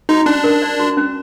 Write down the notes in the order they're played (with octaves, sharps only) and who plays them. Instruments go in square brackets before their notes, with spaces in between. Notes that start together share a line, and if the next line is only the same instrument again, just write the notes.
[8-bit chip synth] D#4 [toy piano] F#4
[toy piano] C#4 [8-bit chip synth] D4
[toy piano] A#4
D5
F#4
C#4